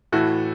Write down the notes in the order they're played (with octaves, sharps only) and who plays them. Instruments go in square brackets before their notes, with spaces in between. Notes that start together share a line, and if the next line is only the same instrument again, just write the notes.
[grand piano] A2 E3 A3 F#4